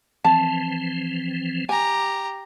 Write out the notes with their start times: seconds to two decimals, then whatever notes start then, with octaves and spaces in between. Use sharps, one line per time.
0.25 E3 F3 C4 A5
1.69 G4 G#5 A#5